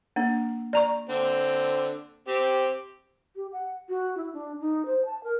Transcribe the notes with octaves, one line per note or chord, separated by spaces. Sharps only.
A#3 D4
D5 A#5 C#6
D3 C4
C4 G4
G4
F#5
F#4
E4
D4
D#4
C5
A5
A#4